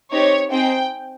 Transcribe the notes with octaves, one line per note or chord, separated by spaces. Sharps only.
C4 D#4 G4 C#5
C4 D#4 G#4 G5